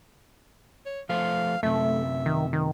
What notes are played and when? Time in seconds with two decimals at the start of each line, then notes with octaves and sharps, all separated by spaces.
0.86 C#5
1.09 F3 A3 C5 F5
1.63 F#2 C3 A3 E5
2.26 D#3
2.53 D#3